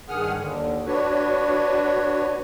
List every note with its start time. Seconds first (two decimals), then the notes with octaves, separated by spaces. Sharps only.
0.09 G2 D#3 G#4 F#5 D#6 F6
0.35 D#2 D3
0.86 D4 F#4 B4 C#5